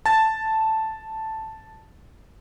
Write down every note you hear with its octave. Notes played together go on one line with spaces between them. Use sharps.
A5 A6